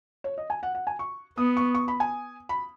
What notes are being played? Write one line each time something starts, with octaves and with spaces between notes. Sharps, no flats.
C#5
D#5
G#5
F#5
F#5
G#5
C#6
B3 D#6
C#6
C#6
B5
G#5
B5